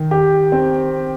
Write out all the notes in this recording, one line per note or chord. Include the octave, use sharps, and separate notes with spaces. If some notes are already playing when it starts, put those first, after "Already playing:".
Already playing: D#3
G4
C4